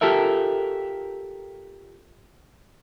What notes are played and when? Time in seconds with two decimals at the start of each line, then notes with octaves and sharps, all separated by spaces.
0.01 F4 G4 A4 A#4 E5